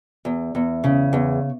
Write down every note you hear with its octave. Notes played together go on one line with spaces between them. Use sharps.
E2
E2
C#3
E2